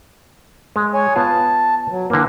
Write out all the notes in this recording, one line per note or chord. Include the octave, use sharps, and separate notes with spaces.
G#3
C#5 G#5
B3 F4 A5
F#3
D3 E3 A#3